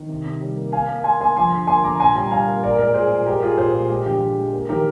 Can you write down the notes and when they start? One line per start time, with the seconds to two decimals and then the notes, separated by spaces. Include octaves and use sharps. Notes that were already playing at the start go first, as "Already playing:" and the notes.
Already playing: D#3
0.09 C3
0.26 C3
0.41 G3
0.58 A#3
0.72 A#3 F5 G#5
0.89 A#3
1.04 A#3 G#5 C6
1.20 A#3 G#5 C6
1.36 F3 G#5 C6
1.52 D3
1.67 A#3 G#5 C6
1.84 D3 A#5 D6
2.00 A#2 G#5 C6
2.15 G3 G5 A#5
2.31 G3 F5 G#5
2.48 A#3
2.63 A#2 A#4 D5
2.78 G#3 A#4 D5
2.94 A#2 G#4 C5
3.10 A#2
3.26 G#3 G4 A#4
3.42 G#3 F4 G#4
3.57 A#2 G#4 C5
3.74 A#2
3.90 G#3 G4
4.06 D3 G4
4.21 D3
4.37 G#3
4.53 A#3
4.69 D#3 G4 A#4